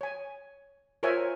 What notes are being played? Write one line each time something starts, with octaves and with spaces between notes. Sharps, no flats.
C#5 G#5
F4 A#4 C5 C#5 E5 G#5